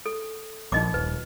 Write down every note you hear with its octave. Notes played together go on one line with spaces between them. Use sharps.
A4
A#1 D#4 D#5 D6
D#1 B4